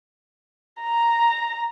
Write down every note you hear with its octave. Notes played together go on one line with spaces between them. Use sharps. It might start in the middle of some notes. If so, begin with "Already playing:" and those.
A#5